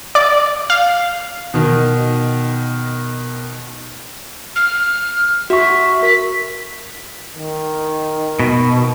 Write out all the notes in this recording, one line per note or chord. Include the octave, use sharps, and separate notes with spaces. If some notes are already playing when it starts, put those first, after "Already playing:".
D5
F5
B2 D#3
F6
F#4 E5 C#6
A#4 B6
D#3
B2